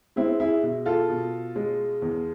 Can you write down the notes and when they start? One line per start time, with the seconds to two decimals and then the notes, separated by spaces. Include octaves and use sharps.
0.16 G#3 C4 E4
0.40 E4 G#4
0.63 B2
0.86 F4 A4
1.09 B2
1.56 G#3
2.02 E2